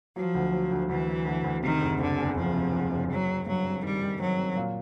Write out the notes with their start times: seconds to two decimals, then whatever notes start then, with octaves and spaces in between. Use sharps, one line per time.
0.16 F3 F#3
0.35 D2
0.52 F#3
0.72 D2
0.89 D2 E3
1.08 F#3
1.26 D2
1.44 D2
1.62 C3 D#3
1.81 F#1
1.99 F#1 D3
2.18 E2
2.36 F#1 F3
2.54 C3
2.72 E2
2.91 F#1
3.09 F#3 C4
3.28 C4
3.46 G2 F#3
3.65 C4
3.83 D#3 G3
4.02 D#3
4.19 F#3 C4
4.38 C4
4.56 A#2